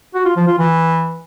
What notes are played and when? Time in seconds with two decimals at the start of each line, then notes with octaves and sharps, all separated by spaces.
0.14 F#4
0.25 F4
0.36 F3
0.48 F4
0.59 E3